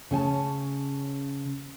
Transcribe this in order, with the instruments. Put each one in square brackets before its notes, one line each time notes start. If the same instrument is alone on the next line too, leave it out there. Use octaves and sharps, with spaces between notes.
[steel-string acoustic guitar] C#3 C#4 G#5 A5